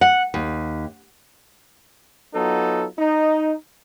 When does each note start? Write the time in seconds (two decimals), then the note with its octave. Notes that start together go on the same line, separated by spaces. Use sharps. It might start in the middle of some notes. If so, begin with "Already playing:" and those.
0.01 F#5
0.34 D#2
2.34 F#3 B3 D#4 F4 A4
2.98 D#4